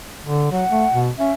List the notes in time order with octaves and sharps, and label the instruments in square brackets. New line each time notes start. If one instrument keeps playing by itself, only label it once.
[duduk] D3
[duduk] F#3 [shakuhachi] F#5
[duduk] A3
B2
[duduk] C#4 [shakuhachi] E5